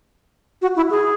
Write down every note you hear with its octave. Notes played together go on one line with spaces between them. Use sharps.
F#4
E4
G#4